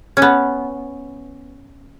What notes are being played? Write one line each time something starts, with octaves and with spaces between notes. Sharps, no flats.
C#4
B3